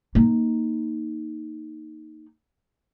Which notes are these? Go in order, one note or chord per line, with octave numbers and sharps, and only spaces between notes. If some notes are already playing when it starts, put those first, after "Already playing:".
A#3 D#4